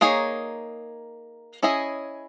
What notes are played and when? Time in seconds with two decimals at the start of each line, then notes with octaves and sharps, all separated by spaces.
0.01 A#3 D#4 G#4 C#5
1.63 C#4 E4 G#4 D#5